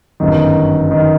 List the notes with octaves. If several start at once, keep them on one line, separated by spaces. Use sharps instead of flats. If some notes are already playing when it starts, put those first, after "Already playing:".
G1 F#2 D#3
D#3